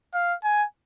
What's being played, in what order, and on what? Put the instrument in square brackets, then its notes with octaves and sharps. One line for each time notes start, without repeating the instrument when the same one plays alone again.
[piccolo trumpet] F5
G#5